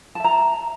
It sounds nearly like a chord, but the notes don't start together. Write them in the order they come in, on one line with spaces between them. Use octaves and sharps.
A5 E5 A#5